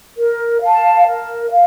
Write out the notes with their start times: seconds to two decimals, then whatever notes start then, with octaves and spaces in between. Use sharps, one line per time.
0.17 A#4
0.61 F5 A5
1.06 A#4
1.50 F5